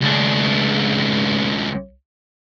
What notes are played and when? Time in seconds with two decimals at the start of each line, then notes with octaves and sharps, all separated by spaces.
0.02 C#2 D4